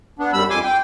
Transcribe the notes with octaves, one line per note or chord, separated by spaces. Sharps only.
B3 D4
F#2 G3 B5 E6
F2 G#5 C6 D6
G5